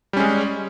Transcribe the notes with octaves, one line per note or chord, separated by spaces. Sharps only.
G3 G#3 C#4